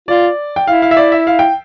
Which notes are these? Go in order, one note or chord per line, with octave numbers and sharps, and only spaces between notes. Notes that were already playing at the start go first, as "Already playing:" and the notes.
F4 D5
G5
E4 F5
F5
E5
D5
E5
F5
G5